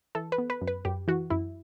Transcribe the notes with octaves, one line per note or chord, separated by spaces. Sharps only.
E3 A4
B4
B3
B4
F#2
B4
F#2 G4
E3 F#4
F#2 E4